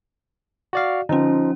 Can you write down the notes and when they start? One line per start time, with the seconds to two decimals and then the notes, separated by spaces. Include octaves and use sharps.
0.73 F#4 D5 F5
1.09 D3 F3 C#4 D#4